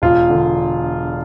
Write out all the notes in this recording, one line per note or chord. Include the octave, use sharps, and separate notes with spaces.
E1 F4
D3